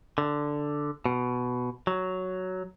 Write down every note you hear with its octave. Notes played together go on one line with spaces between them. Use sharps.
D3
B2
F#3